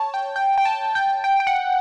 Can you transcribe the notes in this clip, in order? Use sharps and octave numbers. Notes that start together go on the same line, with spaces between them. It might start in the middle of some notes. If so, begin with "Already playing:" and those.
Already playing: C#5 A5
G5
G5
G5
A5
G5
G5
G5
F#5